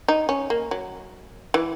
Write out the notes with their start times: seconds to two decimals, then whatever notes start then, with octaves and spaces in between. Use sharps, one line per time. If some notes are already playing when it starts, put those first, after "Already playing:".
0.08 D#4
0.29 C#4
0.50 A#3
0.71 F#3
1.54 E3